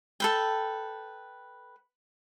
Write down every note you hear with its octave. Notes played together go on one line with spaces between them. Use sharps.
A4 B4 G5